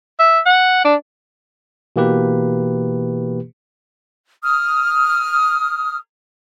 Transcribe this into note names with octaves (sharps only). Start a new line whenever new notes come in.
E5
F#5
D4
B2 E3 A#3 G4 B4
D#6 F6